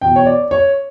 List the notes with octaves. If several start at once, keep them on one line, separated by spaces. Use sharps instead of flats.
E2 B2 G5
C#5
D5
C#5